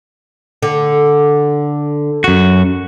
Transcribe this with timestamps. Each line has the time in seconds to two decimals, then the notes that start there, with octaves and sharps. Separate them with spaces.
0.63 D3
2.24 F#2 F#4